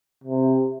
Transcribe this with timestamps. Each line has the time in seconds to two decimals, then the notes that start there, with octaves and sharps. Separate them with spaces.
0.24 C3